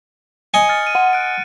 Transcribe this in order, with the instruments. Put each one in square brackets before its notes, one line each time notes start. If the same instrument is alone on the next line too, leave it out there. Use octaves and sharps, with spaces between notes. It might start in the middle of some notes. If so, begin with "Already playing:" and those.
[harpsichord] D#5 G#5 [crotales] C#7
[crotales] F6 A6 C#7
F6 D#7
[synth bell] F#5
[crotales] F#6 D7